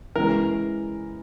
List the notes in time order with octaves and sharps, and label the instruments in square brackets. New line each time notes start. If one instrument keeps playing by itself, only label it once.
[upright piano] E3 G#3 C#4 [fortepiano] A#4